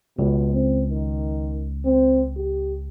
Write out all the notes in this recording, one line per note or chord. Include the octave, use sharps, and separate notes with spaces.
C#2 B2
C4
D#3
C4
G4